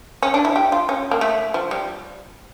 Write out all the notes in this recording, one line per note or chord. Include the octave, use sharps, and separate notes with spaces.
C#4
D4
E4
G4
F4
C#4
A#3
A3
F3
G3